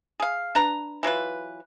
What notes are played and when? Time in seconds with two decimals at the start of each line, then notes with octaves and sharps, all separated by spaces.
0.20 G#4 F5
0.55 D4 B4 A#5
1.03 E3 F#3 F4 B4